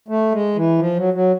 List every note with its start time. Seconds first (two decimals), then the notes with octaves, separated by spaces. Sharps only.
0.08 A3
0.32 G#3
0.56 E3
0.79 F3
0.96 F#3
1.14 F#3